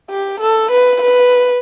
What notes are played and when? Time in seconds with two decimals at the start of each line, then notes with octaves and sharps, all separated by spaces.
0.10 G4
0.40 A4
0.71 B4
1.02 B4